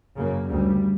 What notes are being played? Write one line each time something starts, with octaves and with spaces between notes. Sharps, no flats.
F#2 C#3 A#3
D2 C#3 G3